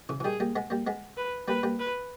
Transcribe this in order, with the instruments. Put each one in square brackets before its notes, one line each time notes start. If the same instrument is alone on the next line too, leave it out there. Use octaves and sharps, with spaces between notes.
[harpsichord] C#3 E3
E3
[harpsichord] D#3 G3 [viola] G#4
[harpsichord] G3 A#3
G#3 B3
G3 A#3
G#3 B3
[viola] B4
[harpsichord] G3 A#3 [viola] B4
[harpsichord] G3 A#3
[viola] B4